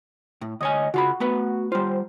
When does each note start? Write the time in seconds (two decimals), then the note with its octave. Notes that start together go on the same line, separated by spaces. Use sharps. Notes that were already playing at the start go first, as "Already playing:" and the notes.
0.41 A2
0.61 D2 C#5 D#5 G#5
0.94 C#3 F4 F#4 B5
1.20 A3 B3 B4
1.72 G3 F4 C5